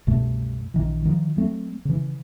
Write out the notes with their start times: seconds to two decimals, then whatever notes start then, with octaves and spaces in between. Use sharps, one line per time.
0.07 C2 F#2 B2 A3
0.74 A#1 D#3 E3
1.05 D#3 F3
1.37 F#3 A3 C4
1.85 C#3 E3